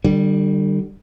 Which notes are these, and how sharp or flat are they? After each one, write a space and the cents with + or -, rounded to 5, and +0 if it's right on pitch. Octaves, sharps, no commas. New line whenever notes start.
D3 +30 G3 -15